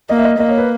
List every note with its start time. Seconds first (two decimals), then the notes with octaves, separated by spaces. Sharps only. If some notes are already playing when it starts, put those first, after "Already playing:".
0.09 A#3 D#5
0.18 E5
0.24 D#5
0.39 A#3 D#5
0.49 C#5
0.58 B4